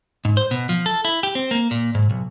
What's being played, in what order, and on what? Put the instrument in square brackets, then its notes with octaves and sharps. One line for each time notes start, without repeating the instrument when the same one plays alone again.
[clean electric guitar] G#2
C5
B2
F3
A4
E4
G4
C4
A#3
A#2
G#2
B1